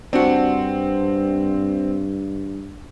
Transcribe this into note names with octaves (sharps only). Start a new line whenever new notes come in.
G2 C4 D4 F#4